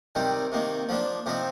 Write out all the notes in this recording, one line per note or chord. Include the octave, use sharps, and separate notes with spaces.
C3 D#3 G3 C4 D#4
C3 D#3 A#3 D#4
F3 A#3 D4
C3 F3 C4 D#4